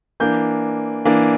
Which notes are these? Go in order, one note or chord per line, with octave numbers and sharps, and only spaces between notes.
E3 A#3 D4 G6
E3 A#3 D4